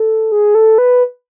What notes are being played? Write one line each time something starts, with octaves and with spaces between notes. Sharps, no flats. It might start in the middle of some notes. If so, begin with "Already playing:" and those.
Already playing: A4
G#4
A4
B4